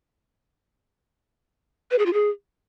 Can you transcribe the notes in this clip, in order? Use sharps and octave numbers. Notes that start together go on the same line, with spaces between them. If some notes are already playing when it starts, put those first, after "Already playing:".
B4
G#4
F4
G#4